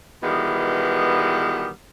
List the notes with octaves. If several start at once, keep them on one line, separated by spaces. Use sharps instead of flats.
B2 D#3 E3 G3 G#3 B3